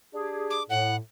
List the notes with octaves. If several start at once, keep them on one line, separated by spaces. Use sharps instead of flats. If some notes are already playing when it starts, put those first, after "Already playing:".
D4 G4 G#4
D6
A2 F#5